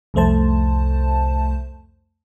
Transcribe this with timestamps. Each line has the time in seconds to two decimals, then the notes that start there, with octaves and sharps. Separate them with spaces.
0.14 C2 F2 A3 C5 A5